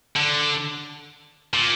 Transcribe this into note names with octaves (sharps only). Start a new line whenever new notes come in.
D3
A#2